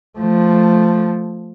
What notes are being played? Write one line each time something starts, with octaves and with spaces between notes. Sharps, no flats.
F3 A3